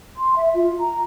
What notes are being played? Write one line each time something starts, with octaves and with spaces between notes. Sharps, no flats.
C6
E5
F4
A#5